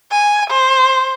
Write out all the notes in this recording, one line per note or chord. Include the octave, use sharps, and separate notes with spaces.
G#5
C5